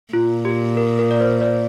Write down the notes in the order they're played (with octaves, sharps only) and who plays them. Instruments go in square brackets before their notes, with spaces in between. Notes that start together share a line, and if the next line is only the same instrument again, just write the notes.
[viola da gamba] A#2 [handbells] F4
[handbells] G4
A#4
A#4
D5
C5
D5